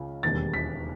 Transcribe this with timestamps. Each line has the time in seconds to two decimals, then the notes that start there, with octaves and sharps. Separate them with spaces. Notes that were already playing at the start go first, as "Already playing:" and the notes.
Already playing: C#2 C#3
0.23 E1 D#2 D#3 G3 A6
0.54 B6